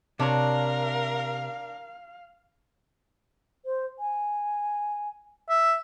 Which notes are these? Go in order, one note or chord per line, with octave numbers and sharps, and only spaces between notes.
C3 D4 A#4 C#5 F5
C5
G#5
E5